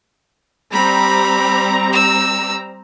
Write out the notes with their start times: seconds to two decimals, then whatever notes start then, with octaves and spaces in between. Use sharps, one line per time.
0.73 G3 C4 A#5 B5
1.93 E6